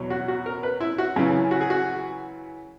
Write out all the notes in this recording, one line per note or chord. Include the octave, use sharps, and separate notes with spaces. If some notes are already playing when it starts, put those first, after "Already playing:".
Already playing: E2 B2 F#3
F#4
F#4
A#4
B4
E4
F#4
F#2 C#3 E3 G#4
F#4
G#4
F#4